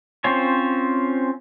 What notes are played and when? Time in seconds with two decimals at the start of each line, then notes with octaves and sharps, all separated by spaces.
0.24 C4 C#4 F4 C5 C#5